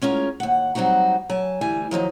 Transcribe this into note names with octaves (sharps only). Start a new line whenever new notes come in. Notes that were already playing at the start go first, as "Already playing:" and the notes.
G#3 C#4 F4 A#4
D#2 F#5
F#3 G3 C4 D#4 F#4
F#3 G#5 A5
D2 E3 G3 G#5
D#3 F3 F#3 D#4